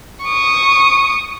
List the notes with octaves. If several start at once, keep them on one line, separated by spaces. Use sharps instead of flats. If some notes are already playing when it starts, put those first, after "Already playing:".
C#6 D#6